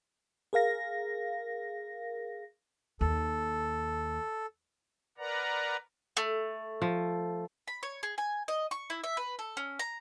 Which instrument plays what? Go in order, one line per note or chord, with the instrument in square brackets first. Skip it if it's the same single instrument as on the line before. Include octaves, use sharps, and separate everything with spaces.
[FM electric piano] G#4 A#4 F5 A#6
[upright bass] D#2 [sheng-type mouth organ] A4
[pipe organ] A#4 B4 D5 F#5 A#5
[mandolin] A3
[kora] F3
[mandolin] B5
C#5
G#4
G#5
D#5
C#6
E4
E5
B4
A4
C#4
A#5